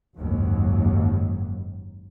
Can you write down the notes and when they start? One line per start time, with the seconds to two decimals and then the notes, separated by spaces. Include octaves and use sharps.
0.16 F#1 D#2 G#2 F#3